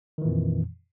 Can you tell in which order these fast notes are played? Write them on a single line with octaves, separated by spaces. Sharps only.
D#3 E3 A#2 F2